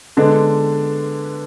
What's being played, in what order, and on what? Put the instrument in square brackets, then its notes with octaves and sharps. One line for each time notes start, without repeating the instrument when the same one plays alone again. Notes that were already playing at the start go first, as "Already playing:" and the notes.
[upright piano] D3 G#3 B3 D4